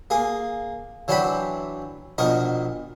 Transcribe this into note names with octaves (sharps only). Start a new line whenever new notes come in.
A#3 G#4
E3 F#3 D4 C5 G5 B5
A#1 B2 D#4 A#4 D#5